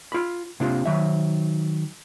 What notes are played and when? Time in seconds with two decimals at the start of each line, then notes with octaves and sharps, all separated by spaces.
0.12 F4 B5
0.60 C3 A#3 D4 F4
0.86 D#3 F#3 E5